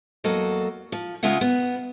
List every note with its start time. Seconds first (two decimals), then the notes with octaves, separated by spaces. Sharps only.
0.24 E2 F#3 A#3 F#4 A4 D#5
0.92 F3
1.23 C#3 G#3 C#4 F4 E5 F#5
1.41 B3